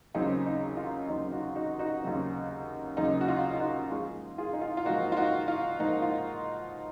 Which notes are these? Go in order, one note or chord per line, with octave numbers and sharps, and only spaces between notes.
D#2 C#3 F#3 C4 D#4
D#4
F4
D#2 C#3 F#3 C4 D#4
D#4 F#4
D#4 F#4
D#4 F#4
D#2 C#3 F#3 C4
D#2 C#3 F#3 C4 D#4
F#4
F4
F4
D#4 F#4
G#2 F3 A#3 F4 G#4
F4 G#4
D#4
F4
F4
G#2 F3 A#3 D#4 F#4
F4
D#4 F#4
F4
G#2 F3 A#3 D#4
F4